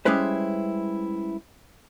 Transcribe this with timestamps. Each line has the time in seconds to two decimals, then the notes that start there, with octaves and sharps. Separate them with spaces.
0.05 G3 G#3 C#4 E4 B4 C5